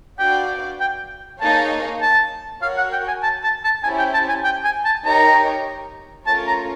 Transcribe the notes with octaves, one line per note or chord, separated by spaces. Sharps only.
D4 F#4 B4 D5 F5 G5
G5
A#3 D#4 G#4 C#5 F5 A5
A5
F#4 A#4 C#5 F5
F#5
G5
G#5
A5
A5
A5
C#4 E4 G4 C5 G#5
G5
A5
G#5
G5
G#5
A5
D#4 G4 A#4 C#5 A#5
A3 C#4 F4 A#4 C#5 A5
A#5